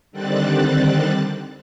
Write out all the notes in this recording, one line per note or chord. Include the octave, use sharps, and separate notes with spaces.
D3 D#3 G3 C4 F#6 A6